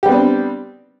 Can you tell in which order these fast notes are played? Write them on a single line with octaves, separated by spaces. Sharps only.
G4 G3 B3 C4 D4